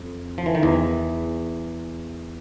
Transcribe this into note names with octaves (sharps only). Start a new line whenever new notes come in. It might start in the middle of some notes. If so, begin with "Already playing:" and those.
Already playing: F2
F3
E3
D#3
E2 E3